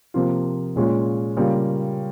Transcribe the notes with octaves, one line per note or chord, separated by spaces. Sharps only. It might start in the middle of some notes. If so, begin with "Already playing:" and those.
C3 F3 A#3 F4
A#2 G#3 C#4 F4
C#3 G3 A#3 F4